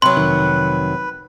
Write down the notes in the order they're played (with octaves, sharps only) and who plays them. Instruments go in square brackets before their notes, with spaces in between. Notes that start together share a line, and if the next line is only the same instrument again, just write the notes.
[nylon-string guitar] C3 F#3 [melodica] B4 [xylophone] C6
[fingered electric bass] F1 D#3